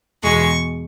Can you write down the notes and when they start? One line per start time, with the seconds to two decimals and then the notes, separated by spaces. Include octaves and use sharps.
0.23 E2 B2 G#3 C#6